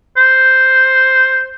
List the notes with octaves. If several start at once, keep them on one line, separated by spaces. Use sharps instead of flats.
C5